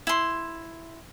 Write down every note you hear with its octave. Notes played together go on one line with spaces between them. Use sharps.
E4 C6